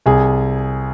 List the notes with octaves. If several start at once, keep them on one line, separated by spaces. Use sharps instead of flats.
C2 G#4